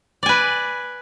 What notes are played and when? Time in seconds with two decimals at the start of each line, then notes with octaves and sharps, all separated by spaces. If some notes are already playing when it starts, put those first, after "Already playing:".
0.23 D5
0.26 G#5
0.29 B4